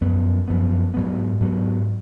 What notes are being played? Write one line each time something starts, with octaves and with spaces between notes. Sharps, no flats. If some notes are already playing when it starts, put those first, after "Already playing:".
F#2 F3 B3
F#2 F3 B3
G#2 F#3 B3
G#2 F#3 B3